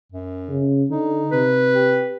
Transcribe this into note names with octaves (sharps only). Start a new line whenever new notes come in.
F#2
C#3
D3 D#4
C3 B4
G4